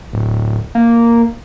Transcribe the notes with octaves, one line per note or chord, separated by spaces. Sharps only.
D1
A#3